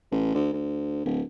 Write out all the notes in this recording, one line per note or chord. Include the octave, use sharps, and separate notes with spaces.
A1
D2
D2
D1